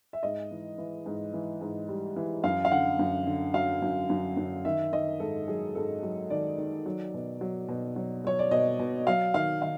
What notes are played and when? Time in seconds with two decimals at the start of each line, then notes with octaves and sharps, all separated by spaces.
0.13 E5
0.23 G#2 D#5
0.51 E3
0.78 E3
1.06 G#2
1.34 E3
1.61 G#2
1.89 G3
2.16 E3
2.44 F#2 F5
2.65 F5
2.71 D3 F#5
2.99 F#2
3.27 D3
3.54 F#3 F5
3.82 F#2
4.10 F#2
4.37 F#2
4.65 D#3 E5
4.92 D#3 D#5
5.20 G#2 A4
5.48 F#3 G#4
5.75 G#2 A4
6.03 F#3
6.30 D#3 D5
6.58 D#3
6.86 F#3
7.14 B2
7.41 F#3
7.68 B2
7.96 F#3
8.25 F#3 C#5
8.39 D5
8.51 B2 D#5
8.79 B2
9.07 F#3 F5
9.34 D#3 F5
9.62 D#3 F5